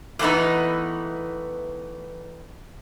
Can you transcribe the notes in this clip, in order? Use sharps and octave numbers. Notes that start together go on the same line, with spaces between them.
E2 A2 E3 B3 D#4